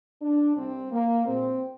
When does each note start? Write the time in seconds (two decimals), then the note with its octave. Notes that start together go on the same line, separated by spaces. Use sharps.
0.22 D4
0.57 C2 C3 G3 C4
0.92 A#3
1.25 A#1 A#2 G#3 C4